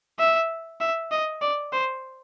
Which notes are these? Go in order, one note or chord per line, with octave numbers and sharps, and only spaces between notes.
E5
E5
D#5
D5
C5